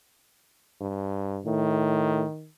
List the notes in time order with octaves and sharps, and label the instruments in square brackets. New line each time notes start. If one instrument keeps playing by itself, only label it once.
[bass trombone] G2
[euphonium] A2 [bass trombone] D#3